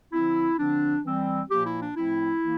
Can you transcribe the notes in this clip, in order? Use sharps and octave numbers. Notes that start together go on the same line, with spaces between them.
D3 F3 C4 E4
D3 F3 C4 D4
E3 G3 C4
A#2 F3 A#3 G4
E4
D4
A2 F3 A3 C4 E4
E3 A#3